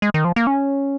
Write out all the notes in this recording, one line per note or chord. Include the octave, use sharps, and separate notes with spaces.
G#3
D#3
F3
A#3
C#4